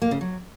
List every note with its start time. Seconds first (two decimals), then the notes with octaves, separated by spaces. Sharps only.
0.02 A#3
0.11 C#3
0.21 F#3